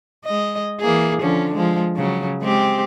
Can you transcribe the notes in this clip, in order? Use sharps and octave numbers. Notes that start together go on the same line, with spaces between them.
G#3 D#5
E3 A#3 G#4
D3 F3 C#4
F3 G#3
C#3 F#3
G#3 C4 G4